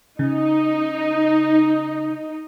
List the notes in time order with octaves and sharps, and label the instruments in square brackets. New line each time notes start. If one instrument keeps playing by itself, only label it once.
[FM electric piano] C#3 [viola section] D#4